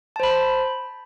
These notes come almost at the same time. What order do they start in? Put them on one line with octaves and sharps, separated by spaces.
A5 C5 B5